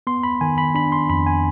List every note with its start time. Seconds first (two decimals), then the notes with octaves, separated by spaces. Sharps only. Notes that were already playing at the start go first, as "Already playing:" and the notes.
0.07 B3 C6
0.23 B5
0.41 D#3 G#5
0.58 B5
0.75 D4 B5
0.92 C6
1.10 F2 B5
1.27 G#5